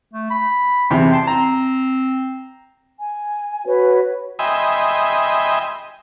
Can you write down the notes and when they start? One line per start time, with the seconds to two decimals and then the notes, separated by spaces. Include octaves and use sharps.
0.13 A3
0.30 B5
0.90 E2 C3 G5
1.11 G5 A5 C6
1.27 C4 A#5
2.99 G#5
3.65 F#4 B4 C#5
4.39 D#5 E5 G5 G#5 B5 C6